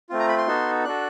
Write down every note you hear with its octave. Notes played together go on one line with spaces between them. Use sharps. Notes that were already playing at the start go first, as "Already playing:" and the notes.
A3 C4 F4
A#5
B5
C6
B3 D#4 F#4 A4
D4 F#4 A4 F#6